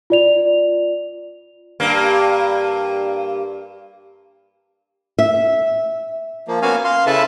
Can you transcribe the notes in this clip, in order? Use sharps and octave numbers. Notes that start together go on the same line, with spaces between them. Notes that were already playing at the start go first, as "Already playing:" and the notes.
F4 D5 F7
G2 A#3
E5
F3 A#3
A#3 B3 C#4 F#4 F5 G#5
F5 C6
C#3 E4 A4 B4 E5 A5